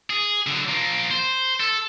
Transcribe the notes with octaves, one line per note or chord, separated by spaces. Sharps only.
G#4
D3 F#3
F3 A#3
C5
A4